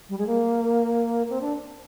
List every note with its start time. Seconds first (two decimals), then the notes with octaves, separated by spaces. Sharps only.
0.09 G3
0.18 G#3
0.27 A#3
1.30 C4
1.41 D4